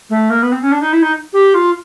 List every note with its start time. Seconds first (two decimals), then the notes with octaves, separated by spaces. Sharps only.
0.10 A3
0.30 A#3
0.43 B3
0.52 C4
0.62 C#4
0.72 D4
0.81 D#4
0.93 E4
1.02 D#4
1.33 G4
1.54 F4